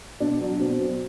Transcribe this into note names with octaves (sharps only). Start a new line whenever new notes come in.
B2 D4
F#3
B2 C4
F#3